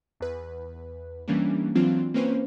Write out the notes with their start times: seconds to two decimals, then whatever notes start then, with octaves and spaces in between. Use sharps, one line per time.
0.20 E2 B4
1.28 E3 G3 A#3 C#4 D4
1.75 E3 F#3 C4 D4 F4
2.14 A#3 C4 C#4 B4 C5